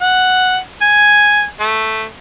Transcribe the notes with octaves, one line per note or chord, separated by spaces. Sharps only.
F#5
G#5
A3